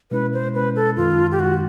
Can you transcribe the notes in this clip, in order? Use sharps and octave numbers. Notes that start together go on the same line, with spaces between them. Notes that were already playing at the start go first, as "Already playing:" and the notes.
B2 G#3 C#4 E4 B4
C5
B2 G#3 C#4 E4 B4
A4
F#2 D#3 G#3 F4
G4
F#2 D#3 G#3 F#4